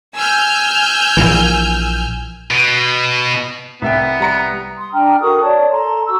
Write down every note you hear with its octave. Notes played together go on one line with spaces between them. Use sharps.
G#5 E6 F6 G6
A#1 A#2 E3
B2
C2 B3 E5 G5
G3 A#5 C#7
C6 D#6
D4 G5 A#5 F6
F#4 A4 A#4 D#6
C#5 D5 A5
A4 A5 A#5 C6
F#4 E6